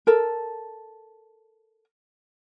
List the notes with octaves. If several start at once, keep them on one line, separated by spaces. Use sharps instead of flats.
A4 A#4